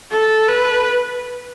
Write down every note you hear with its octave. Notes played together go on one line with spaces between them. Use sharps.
A4
B4